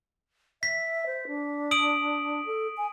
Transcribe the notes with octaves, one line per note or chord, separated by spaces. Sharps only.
E5 B6
C5
D4
D#6 D7 F#7
A4
G#5